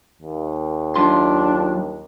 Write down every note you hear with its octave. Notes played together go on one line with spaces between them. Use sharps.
D#2
F#2 D4 F4 C6